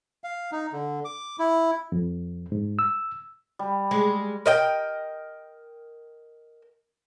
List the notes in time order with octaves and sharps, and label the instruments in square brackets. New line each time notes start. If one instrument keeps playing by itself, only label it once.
[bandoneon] F5
D#4
D3
D6
E4
[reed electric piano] F2
G#2
E6
[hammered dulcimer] G3
[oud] G#3
[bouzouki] A#4 D#5 G5